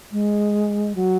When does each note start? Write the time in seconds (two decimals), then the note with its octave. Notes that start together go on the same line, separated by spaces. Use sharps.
0.12 G#3
0.95 F#3